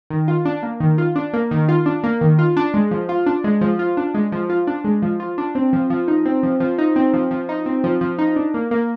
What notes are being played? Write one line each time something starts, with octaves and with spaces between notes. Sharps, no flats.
D#3
F4
D4
A#3
D#3
F4
D4
A#3
D#3
F4
D4
A#3
D#3
F4
D4
G#3
F3
F4
D4
G#3
F3
F4
D4
G#3
F3
F4
D4
G#3
F3
F4
D4
C4
F3
F3
D#4
C4
F3
F3
D#4
C4
F3
F3
D#4
C4
F3
F3
D#4
D4
A#3
A#3